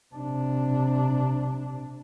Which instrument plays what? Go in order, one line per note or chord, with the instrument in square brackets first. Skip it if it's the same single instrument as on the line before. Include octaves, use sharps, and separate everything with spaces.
[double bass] C3 D4